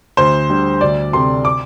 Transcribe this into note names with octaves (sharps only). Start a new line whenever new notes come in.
D2 C5
D3 G3
D2 D5
C3 A3 C4 C6
D6